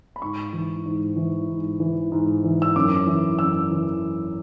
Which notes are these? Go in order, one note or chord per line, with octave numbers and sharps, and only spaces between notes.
B5
G#2 C#6
E3
G#2
E3
G#2
E3
G#2
E3
E6
F#2 D6
E3
F#2 E6
E3